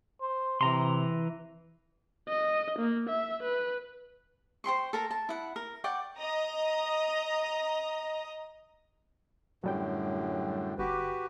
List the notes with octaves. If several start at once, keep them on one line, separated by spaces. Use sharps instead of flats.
C5
C3 E3 A#5 C6
D#5
A#3
E5
B4
C5 G5 C6 C#6
A4 A#4 A#5
A5
E4 F#5
A#4
D5 F#5 G5 C#6
D#5 A#5 D#6
F#2 A2 D3 F#3 G3 G5
G1 F#4 G4 B4 D6